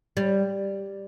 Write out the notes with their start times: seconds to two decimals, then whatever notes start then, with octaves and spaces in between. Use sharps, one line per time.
0.17 G3